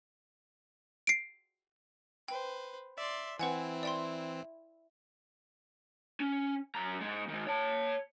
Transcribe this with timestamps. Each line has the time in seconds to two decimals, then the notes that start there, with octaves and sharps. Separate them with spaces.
1.07 C7 D7
2.28 B4 C5 G5
2.98 D5 E5 C6
3.39 E3 C4 E4 B4 F#5 G#5
3.83 D5 G5 C6
6.20 C#4
6.75 F#2 A#5
7.01 G#2 G#3
7.28 D#3 G#3
7.47 C#5 A5